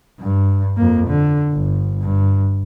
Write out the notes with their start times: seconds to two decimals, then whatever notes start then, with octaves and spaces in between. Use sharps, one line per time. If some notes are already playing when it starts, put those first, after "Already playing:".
0.20 G2
0.77 F2 A#3
1.07 D3
1.53 G1
2.02 G2